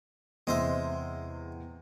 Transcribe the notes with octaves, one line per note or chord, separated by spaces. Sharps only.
E2 C3 G#3 C5 E5